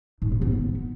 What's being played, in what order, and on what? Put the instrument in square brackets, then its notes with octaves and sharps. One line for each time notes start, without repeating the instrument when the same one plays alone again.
[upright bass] G#2
C3
B3